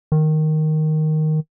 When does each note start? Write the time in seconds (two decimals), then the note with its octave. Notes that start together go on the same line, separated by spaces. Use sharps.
0.12 D#3